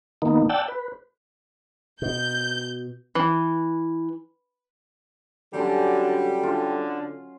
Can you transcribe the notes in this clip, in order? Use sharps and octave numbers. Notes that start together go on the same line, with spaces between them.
D#3 A#3 B3 D#4
D5 F#5 G5 A5 E6
B4
B2 G6
E3
D3 F#3 G3 C#4 G4 A4
D3 F4